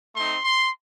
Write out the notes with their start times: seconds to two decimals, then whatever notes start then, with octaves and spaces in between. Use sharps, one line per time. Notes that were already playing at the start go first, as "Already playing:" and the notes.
0.16 A3 C4 D#4 C6
0.44 C6